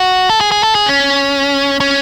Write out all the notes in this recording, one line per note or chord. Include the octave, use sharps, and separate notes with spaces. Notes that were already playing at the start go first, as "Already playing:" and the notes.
Already playing: F#4
A4
G#4
G#4
A4
G#4
C#4
C#4